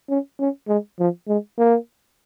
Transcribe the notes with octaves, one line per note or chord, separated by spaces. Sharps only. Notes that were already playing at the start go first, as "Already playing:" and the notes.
C#4
C#4
G#3
F3
G#3
A#3